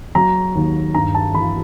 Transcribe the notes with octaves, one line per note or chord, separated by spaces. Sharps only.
F#3 A#5
D#2
G2 A#5
A5
E3 B5